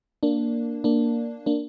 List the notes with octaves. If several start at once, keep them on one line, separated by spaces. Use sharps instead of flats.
A#3 D4
A#3 D4
A#3 D4